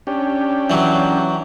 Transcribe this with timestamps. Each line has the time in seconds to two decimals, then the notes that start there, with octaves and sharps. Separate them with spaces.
0.07 C#4 D4 G4
0.70 E3 F#3